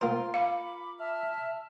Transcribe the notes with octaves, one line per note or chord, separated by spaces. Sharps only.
A#3 F4 A#4 C5 C6
F5 B5 D6
E5 A5 F6